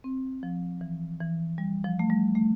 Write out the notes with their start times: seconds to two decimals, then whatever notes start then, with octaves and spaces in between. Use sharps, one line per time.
0.04 C4
0.43 F3
0.81 E3
1.20 E3
1.58 G3
1.84 F3
1.99 A3
2.10 G3
2.35 A3